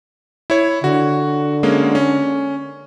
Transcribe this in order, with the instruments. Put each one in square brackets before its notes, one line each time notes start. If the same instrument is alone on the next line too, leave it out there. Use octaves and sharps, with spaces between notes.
[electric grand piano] E4 C#5
[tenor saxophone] D3 [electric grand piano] F#4
[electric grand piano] G#3 A#3 C#4
C#4